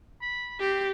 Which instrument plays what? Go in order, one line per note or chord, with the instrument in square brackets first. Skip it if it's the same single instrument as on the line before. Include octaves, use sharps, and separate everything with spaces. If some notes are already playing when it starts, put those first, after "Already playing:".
[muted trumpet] B5
[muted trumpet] C4 [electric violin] G4